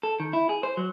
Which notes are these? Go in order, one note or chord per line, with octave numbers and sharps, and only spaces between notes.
A4
D#3
E4
G#4
C5
F#3